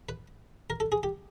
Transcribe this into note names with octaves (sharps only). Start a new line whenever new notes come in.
B4
A#4
A4
G#4
G4